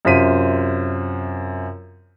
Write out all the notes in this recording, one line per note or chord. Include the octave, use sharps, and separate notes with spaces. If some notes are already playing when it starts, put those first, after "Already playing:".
F#2 C3 F4 C5 B6 D#7